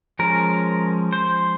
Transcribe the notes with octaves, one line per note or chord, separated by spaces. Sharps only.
F3 G#3 C#4 A#4
C5